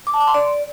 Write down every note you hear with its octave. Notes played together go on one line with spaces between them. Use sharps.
D6
A5
D6
C6
D5